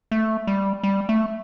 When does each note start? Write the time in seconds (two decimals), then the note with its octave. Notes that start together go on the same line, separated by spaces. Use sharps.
0.11 A3
0.47 G3
0.83 G3
1.09 A3